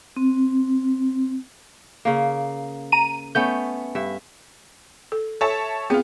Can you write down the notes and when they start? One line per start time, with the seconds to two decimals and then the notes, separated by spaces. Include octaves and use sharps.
0.16 C4
2.05 C#3 A#3
2.92 A#5 D#7
3.35 A3 B3 C#4 G6
3.95 G2 E5
5.12 A4
5.41 A4 C#5 E5 A5
5.90 B3 C4 F4 G#4